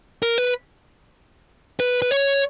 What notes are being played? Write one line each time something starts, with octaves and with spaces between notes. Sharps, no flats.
A#4
B4
B4
B4
C#5